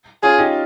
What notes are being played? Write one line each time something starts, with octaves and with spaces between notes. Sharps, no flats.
C#4 F4 G#4
D#4 G4